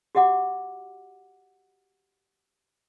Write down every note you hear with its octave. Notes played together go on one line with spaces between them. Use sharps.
F#4 G4 D#5 F#5 D6